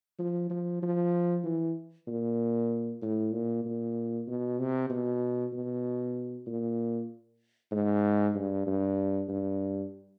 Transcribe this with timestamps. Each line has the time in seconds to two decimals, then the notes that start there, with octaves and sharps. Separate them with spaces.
0.19 F3
0.50 F3
0.82 F3
1.44 E3
2.07 A#2
3.02 A2
3.32 A#2
3.65 A#2
4.28 B2
4.59 C3
4.89 B2
5.53 B2
6.46 A#2
7.72 G#2
8.35 G2
8.67 G2
9.29 G2